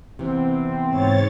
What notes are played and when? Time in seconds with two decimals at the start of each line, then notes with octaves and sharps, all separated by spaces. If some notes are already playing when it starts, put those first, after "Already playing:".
0.19 C3 E3 B3 C4
0.88 G#2 C#5 A6